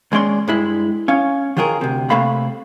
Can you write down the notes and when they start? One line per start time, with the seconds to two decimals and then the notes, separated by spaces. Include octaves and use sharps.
0.12 D#2 G#3 C#4 D5 C6
0.48 G2 G#3 E4
1.08 C#4 F5
1.57 D#3 F#3 F4 G#4 A#4
1.81 D2 C3
2.10 C3 A3 A#3 A4 F5 B5